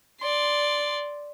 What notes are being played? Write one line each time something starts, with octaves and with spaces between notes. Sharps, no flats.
D5 C6